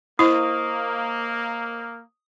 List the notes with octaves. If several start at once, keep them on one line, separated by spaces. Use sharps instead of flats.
A#3 E4 C5 D#5 C#6 D#6